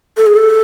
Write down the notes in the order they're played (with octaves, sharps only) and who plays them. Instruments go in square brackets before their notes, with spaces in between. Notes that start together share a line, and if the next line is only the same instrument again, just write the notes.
[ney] A4
G#4
A4